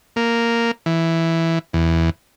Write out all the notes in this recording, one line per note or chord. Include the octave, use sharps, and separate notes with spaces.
A#3
E3
E2